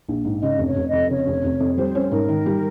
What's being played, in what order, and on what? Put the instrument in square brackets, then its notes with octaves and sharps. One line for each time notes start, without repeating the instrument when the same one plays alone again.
[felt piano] A#1
G#2
[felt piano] C#3 [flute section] D#5
[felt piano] F1
[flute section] C#5
[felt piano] F1
[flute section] D#5
[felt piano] F2
[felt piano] C#3 [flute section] C#5
[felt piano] F1
F1
F2
[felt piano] G3 [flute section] C5
[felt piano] C#4
[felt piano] G#2 [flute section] A#4
[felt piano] D#3
G3